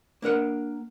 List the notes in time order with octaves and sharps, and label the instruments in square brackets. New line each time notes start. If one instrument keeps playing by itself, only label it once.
[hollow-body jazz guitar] A#3 D4 A#4 F#5